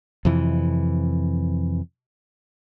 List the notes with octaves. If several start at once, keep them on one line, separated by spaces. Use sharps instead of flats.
F2 C3 E3